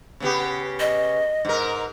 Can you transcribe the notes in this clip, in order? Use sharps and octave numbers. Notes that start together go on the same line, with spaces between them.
C#3 B3 G4
D#5
G#2 A#4